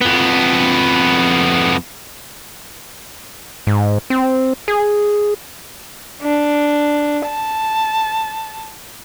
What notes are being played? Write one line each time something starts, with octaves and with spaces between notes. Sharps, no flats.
F2 B3
G#2
C4
G#4
D4
A5